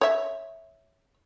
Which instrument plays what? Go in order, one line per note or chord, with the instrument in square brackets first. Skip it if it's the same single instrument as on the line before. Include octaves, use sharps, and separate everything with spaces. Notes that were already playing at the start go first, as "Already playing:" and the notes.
[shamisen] C#5 E5